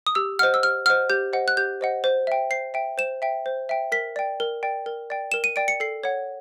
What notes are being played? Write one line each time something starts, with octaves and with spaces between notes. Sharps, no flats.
D#6
G4 E6
C5 D#5 F#5 F6
E6
G4 F6
C5 D#5 F#5 F6
G4 G6
C5 D#5 F#5
F#6
G4 G6
C5 D#5 F#5
C5
E5 G5
C5 C7
E5 G5
C5 E7
E5 G5
C5
E5 G5
A#4 B6
D5 G5
A#4
D5 G5
A#4
D5 G5
A#4 E7
D#7
D5 G5 D7
C#7
A4 C7
C#5 F#5